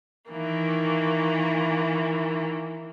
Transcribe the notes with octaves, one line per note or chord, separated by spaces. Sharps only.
D#3 E3 A#3